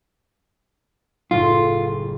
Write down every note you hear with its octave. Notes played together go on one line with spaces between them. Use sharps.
F#1 A2 F4